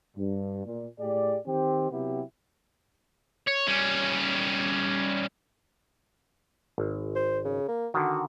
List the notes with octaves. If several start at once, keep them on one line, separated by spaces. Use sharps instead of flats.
G2
A#2
A2 G4 G#4 D5
D#3 C4 G4
C3 F#3 B3 E4 G4
C#5
G3 C#4
G#1
C5
C#3
A#3
D3 D#3 F#4